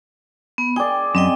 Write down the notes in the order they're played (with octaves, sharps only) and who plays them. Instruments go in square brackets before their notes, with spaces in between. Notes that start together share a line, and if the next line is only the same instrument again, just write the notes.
[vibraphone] B3
[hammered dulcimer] G#4 D5 [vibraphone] G5
[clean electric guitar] F#2 [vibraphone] C4 D#5 G5